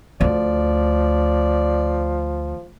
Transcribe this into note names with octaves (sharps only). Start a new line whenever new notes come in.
D2 F3 D5